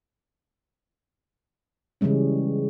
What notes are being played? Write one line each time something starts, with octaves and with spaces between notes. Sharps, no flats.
C#3 E3 G3 G#3 C#4